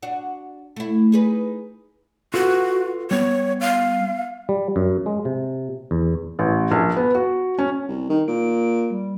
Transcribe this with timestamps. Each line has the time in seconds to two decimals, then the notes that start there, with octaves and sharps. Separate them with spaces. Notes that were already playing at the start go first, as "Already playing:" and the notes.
0.03 D4 F#4
0.76 A3 E4
1.12 D#4 G#4 B4
2.34 F4 F#4 A4 B4
3.11 G3 B3 C#5
3.61 F5
4.49 G3
4.76 F#2
5.06 G#3
5.25 C3
5.91 E2
6.39 A1
6.71 A#1
6.97 B3
7.15 F#4
7.59 C#4
7.88 C2
8.09 D#3 D#4
8.28 A#2 D7
8.91 G3